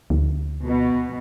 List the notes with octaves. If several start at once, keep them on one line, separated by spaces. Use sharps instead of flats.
D2
B2